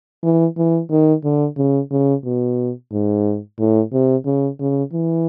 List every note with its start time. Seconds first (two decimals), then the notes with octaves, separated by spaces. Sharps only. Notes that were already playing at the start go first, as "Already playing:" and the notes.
0.23 E3
0.57 E3
0.90 D#3
1.24 D3
1.57 C#3
1.91 C#3
2.25 B2
2.92 G#2
3.59 A2
3.93 C3
4.26 C#3
4.60 C#3
4.93 E3